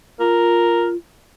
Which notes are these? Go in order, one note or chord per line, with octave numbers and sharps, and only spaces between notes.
F4 A#4